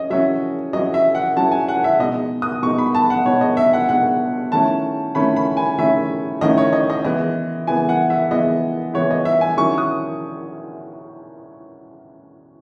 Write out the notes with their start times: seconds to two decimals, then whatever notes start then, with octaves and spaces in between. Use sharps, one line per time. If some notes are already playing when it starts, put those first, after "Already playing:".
Already playing: C#4 D#5
0.10 F#3 C#4 E4 E5
0.73 F#3 C#4 E4 D#5
0.94 E5
1.15 F#5
1.36 F#3 C#4 E4 A5
1.52 G#5
1.68 F#5
1.84 E5
1.99 B2 G#3 D#4 D#5
2.42 D#6
2.63 B2 G#3 D#4 C#6
2.78 B5
2.95 A5
3.10 F#5
3.25 B2 G#3 D#4 C#5
3.41 D#5
3.57 E5
3.73 F#5
3.89 B2 G#3 D#4 F#5
4.52 D#3 A3 C#4 E4 A5
5.15 D#3 A3 C#4 E4 B5
5.36 B5
5.57 G#5
5.78 D#3 A3 C#4 E4 E5
6.41 D#3 A3 C#4 E4 D#5
6.58 C#5
6.73 D#5
6.90 D#5
7.05 E3 G#3 B3 E4 D#5
7.67 E3 G#3 B3 E4 G#5
7.89 F#5
8.10 E5
8.31 E3 G#3 B3 E4 D#5
8.94 E3 G#3 B3 E4 C#5
9.11 D#5
9.25 E5
9.41 G#5
9.57 D#3 F#3 C#4 E4 C#6
9.78 D#6